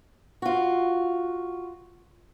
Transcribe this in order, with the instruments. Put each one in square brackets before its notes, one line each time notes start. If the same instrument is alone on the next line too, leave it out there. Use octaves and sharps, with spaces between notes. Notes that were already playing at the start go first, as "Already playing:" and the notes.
[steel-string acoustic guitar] F4 F#4